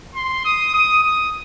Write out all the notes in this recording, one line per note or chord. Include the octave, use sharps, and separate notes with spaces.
C6
D#6
D#6
D#6